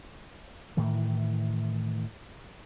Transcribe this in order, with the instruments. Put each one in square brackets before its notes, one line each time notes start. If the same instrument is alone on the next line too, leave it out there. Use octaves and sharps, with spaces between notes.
[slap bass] A2 D#3 E3